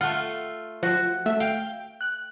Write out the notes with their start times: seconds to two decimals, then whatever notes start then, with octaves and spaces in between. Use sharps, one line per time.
0.01 A3 F4 F#5
0.83 F3 F#4
1.26 A3 E5
1.40 F5 G5
2.01 F#6